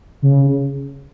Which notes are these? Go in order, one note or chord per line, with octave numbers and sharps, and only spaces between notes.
C#3